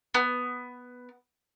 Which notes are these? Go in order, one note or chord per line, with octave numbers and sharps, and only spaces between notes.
B3